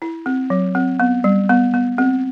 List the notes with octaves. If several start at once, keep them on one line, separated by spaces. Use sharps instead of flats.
E4
C4
F#3
C4
B3
G3
B3
B3
C4